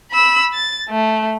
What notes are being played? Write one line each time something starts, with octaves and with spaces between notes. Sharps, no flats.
B5 E6
A6
A3